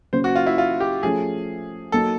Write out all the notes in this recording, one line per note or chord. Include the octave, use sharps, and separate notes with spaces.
C#3 F#3 A#3 C#4 C5
F#4
F4
E4
F4
G4
F3 A3 C#4 F4 G#4 A4
F#3 A#3 D#4 A4